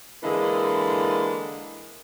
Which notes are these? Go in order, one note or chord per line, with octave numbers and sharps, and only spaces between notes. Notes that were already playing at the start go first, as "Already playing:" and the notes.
D3 E3 G#3 A#3